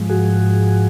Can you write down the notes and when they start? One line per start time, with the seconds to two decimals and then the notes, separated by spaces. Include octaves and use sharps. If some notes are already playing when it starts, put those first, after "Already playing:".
Already playing: G#2 F3 G#3
0.09 F#4 G#4